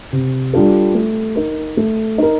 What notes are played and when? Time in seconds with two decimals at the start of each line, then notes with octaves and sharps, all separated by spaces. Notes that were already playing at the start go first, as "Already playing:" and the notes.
0.12 C3
0.53 G3 D4 F4 A4
0.95 A3
1.36 D#4 A#4
1.77 A3
2.18 D#4 A#4